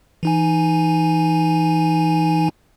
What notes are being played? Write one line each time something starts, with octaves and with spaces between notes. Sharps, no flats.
E3 D#4 G#5